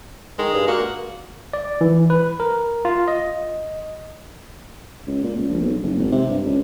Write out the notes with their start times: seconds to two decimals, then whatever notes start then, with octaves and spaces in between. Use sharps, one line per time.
0.39 D#3 G#3
0.54 G2
0.68 A#3 F#4
1.53 D5
1.81 E3
2.10 B4
2.40 A#4
2.85 F4
3.08 D#5
5.07 C#2
5.24 A#2
5.37 C#2
5.50 A#1
5.62 B1
5.83 F#1
5.98 G#1
6.12 C3
6.30 G2
6.46 C#2